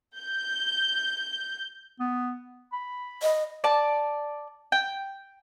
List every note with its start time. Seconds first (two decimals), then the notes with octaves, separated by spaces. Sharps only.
0.19 G6
2.00 B3
2.73 B5
3.22 D#5
3.64 D5 A5
4.72 G5